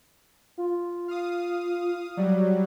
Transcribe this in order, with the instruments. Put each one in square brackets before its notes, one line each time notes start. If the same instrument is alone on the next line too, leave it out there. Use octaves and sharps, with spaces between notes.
[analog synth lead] F4
[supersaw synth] F5 D#6
[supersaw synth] F#3 G3 [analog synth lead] D5